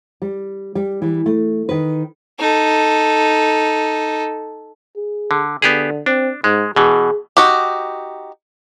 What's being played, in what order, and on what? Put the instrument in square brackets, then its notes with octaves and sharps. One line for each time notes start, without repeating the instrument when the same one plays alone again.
[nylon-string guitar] G3
G3
E3 G3
A3
D#3 B4
[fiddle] D#4 A4
[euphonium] G#4
[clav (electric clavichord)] D3
[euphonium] D3 [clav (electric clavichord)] B3 G4 G#4
[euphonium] C4 [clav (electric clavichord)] D4
[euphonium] G#2 [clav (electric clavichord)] G#3
[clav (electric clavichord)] B2 E3 [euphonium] G#4
[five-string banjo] D#4 F#4 G4